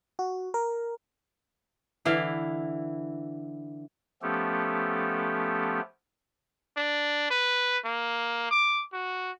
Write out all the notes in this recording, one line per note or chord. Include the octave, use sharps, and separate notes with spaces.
F#4
A#4
D3 E3 E4 F5
F3 A3 B3 C#4 G4 A4
D4
B4
A#3
D6
F#4